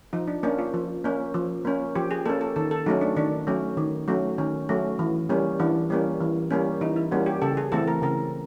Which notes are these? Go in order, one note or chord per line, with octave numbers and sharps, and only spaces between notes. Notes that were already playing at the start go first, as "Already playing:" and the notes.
F3 D#4
D4
A#3 C#4 D4
F4
F3
A#3 C#4
F3
A#3 C#4
F3 G4
G#4
A#3 C#4 A4
A4
D#3 A4
A4
F#3 A3 C#4 D#4
D4
D#3 D4
F#3 A3 C#4
D#3
F#3 A3 C#4
D#3 C#4
F#3 A3 C#4
E3
G3 A#3 C#4
E3 D4
G3 A#3 C#4
E3
G3 A#3 C#4
E3 D#4
E4
G3 A#3 C#4 F#4
G4
C#3 A4
G#4
E3 A3 C4 A4
A#4
C#3 A#4